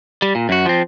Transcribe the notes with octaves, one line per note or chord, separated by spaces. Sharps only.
G3
A#2
F#2 F#4
F3 C4